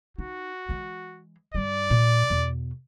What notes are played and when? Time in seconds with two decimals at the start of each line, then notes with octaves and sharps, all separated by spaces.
0.18 D#4 F#4
0.69 E3 G#3
1.55 G2 G3 D5
1.90 A#2
2.30 E2 B2